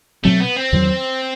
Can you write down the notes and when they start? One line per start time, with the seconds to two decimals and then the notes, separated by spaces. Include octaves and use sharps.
0.24 B2 F#3 A3 C4
0.41 B3
0.57 C4
0.73 E2 D#3 F#3